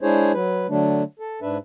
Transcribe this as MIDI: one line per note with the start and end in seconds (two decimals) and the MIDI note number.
0.01 0.32 56
0.01 0.32 62
0.01 0.32 64
0.01 0.32 68
0.01 0.32 72
0.01 0.32 73
0.34 0.67 54
0.34 0.67 71
0.69 1.03 50
0.69 1.03 54
0.69 1.03 57
0.69 1.03 62
1.20 1.40 69
1.42 1.58 44
1.42 1.58 62
1.42 1.58 71
1.42 1.58 76